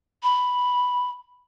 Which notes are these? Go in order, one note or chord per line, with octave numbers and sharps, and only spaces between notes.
B5